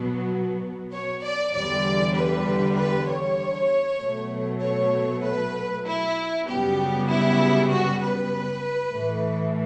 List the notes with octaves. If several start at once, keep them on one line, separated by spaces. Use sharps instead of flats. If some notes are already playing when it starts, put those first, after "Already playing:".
Already playing: B2 F#3 B3
C#5
D5
E2 D3 G3 D5
B4
B4
C#5
B2 F#3 A3
C#5
B4
E4
F#2 C#3 G3 B3 G4
E4
F#4
B4
A2 E3 A3